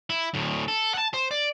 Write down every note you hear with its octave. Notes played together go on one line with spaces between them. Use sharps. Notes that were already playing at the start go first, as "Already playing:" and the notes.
E4
D2 A2
A4
F#5 A5
C5
D5